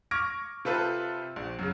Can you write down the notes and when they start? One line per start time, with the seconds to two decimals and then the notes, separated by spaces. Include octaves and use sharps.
0.11 C#6 D6 F6 G#6 A#6 D7
0.65 C3 F4 A4 B4 C5
1.36 A#1
1.59 F#2 C#3